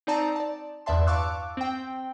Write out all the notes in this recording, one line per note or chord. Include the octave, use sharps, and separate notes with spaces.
C4 D#4 D5 A5 A#5
D5 A5
E2 G2 D5 E5 A5 C6
F5 A5 C#6 D6 E6 F#6
C4 G5